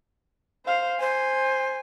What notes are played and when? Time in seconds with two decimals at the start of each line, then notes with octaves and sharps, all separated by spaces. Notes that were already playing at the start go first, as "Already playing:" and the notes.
0.66 C5 F5
1.00 C5 G#5